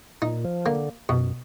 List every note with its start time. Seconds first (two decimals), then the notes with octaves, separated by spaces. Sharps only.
0.22 A#2 D#4
0.45 F3
0.66 D3 A#3
1.09 F#2 B2